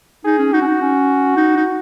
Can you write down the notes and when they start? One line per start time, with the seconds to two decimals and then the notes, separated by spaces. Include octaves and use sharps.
0.25 D#4 G#4
0.38 C#4
0.53 D#4 F#4
0.61 C#4
0.67 D#4
0.81 C#4
1.37 D#4
1.56 D#4